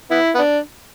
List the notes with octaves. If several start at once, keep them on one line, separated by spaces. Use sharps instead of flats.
B3 E4
B3
D4